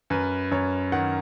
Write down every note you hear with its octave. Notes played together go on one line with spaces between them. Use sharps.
F#2 B4
F#2 C#5
D#3 F#5